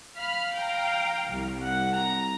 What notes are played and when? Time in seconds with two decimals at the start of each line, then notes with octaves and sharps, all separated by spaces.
0.18 F5 B5 F6
0.55 G5 A#5
1.31 C2
1.62 F#5
1.96 A#5